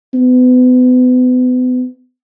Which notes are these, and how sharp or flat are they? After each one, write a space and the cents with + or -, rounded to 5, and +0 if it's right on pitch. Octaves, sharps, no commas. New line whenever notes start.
B3 +35